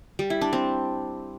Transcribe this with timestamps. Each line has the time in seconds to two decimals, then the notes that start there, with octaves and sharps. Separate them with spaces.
0.19 G3
0.30 E4
0.41 D4
0.53 C4